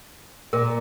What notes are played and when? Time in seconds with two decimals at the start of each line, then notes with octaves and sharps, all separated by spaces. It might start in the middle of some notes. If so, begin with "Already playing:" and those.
0.53 A#2 A#4